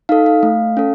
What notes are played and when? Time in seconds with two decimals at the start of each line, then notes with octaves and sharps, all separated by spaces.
0.09 D#4 A4 F5
0.26 F5
0.43 A3
0.77 C#4 A4